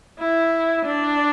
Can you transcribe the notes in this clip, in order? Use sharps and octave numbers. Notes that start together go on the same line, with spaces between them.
E4
D4